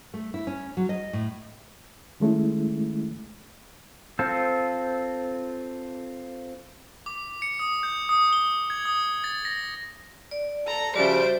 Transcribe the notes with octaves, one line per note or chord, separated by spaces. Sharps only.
A3
E4
C#4
F#3
D#5
A2
D#3 G#3 A3 C#4 E4
C4 F4 A4
D6
C#7
D#6
G6
D#6
G7
G#6
D#6
A6
A#6
D5
A4 A#5
C#3 F3 G3 F#4 C5 D5 E5 D7